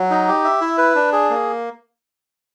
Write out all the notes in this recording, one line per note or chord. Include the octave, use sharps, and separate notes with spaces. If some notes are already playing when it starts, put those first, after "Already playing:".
Already playing: F#3
D#4
G4
E5
E4
B4
D4
G#4
A#3